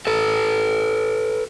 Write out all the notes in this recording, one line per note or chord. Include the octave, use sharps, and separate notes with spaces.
A4 B4